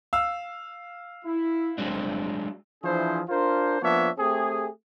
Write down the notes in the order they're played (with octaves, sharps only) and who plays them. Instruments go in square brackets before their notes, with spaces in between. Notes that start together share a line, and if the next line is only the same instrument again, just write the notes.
[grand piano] F5 E6
[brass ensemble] E4
[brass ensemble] G1 C4 [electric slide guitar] F#3 G#3 D4
[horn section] E3 F3 D4 E4 G#4 C5
D4 F4 A#4 C5
F3 A#3 B3 D4 C#5 E5
A3 C4 G4 G#4